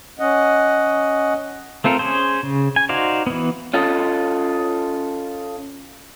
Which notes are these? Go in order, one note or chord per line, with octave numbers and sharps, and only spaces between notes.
C#4 D#5 F#5
A3 C4 F4 A4 A#4
C#4 G#4 C5
C#3
G#5
D#4 F#4 C5 D5 F5
E3 B3
C#4 F4 A4 D#5